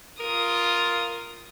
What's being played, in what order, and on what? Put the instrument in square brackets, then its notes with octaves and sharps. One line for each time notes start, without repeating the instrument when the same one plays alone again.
[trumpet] F4 [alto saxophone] A#4 [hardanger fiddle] D#6